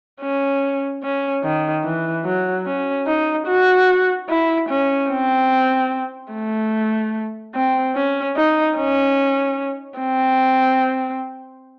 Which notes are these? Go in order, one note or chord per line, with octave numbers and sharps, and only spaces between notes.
C#4
C#4
D#3
E3
F#3
C#4
D#4
F#4
E4
C#4
C4
A3
C4
C#4
D#4
C#4
C4